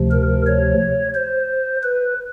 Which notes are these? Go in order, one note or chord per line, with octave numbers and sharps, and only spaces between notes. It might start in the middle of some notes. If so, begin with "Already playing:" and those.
Already playing: D2 C3 F3
A#4
C#5
C5
B4